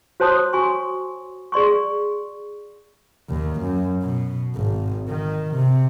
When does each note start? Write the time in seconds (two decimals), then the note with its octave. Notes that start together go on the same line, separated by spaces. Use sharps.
0.20 F#4 C5 C#5 A5 C6 D#6
0.53 F#4 G#5 C6 C#6
1.52 G#4 D5 C6 C#6
3.29 D#2
3.60 F#2
4.02 B2
4.55 G#1
5.08 D#3
5.55 C3